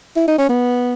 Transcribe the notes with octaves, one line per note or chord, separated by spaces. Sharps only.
E4
D#4
C#4
B3